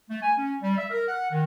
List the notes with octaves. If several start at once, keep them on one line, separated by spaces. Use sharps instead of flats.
A3
G#5
C#4
G3
E5
A#4
F#5
D#3